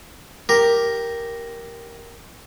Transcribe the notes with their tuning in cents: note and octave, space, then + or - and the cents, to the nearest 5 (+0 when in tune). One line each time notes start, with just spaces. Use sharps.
G4 +0 A#4 +0